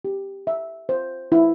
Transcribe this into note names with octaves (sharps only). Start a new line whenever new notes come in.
G4
E5
C5
E4